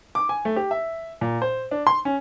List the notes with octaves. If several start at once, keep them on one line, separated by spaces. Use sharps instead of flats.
D6
G#5
A3
G4
E5
A#2
C5
D4
C6
C#4